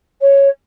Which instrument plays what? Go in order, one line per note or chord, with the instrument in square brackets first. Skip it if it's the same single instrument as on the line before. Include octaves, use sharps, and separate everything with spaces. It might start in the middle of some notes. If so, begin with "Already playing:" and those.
[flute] C#5